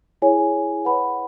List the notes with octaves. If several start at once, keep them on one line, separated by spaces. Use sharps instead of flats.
E4 G#4 C#5 G#5
B4 F#5 B5